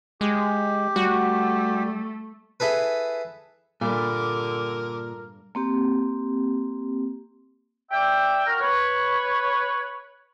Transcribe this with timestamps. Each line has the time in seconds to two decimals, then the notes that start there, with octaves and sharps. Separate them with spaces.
0.21 G#3 G4
0.96 G3 A3 F#4
2.60 E4 G#4 A4 B4
3.81 G2 A#2 D3 A#4 D6
5.55 A#3 C4 G4
7.91 D5 E5 G5
8.46 F#4 A#4 A#5 F6
8.60 B4 C#5